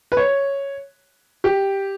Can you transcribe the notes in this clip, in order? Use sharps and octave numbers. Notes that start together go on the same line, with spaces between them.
B4
C#5
G4